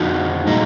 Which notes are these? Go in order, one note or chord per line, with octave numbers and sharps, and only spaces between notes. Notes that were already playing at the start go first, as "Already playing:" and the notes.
Already playing: F2 F3 D#4 F#4
A#2 G#3 D#4